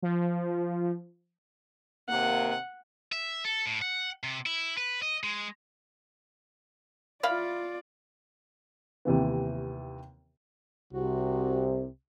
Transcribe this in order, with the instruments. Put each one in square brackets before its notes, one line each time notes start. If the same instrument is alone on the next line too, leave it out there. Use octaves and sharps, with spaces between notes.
[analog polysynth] F3
[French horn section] D#2 C3 A#3 [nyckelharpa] F#5
[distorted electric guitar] E5
A4
A2
F#5
C3
E4
B4
D#5
G#3
[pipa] E4 F5 B5 [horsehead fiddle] F4 D5
[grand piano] D#2 C3 E3 B3
[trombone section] C2 C3 [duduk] F#4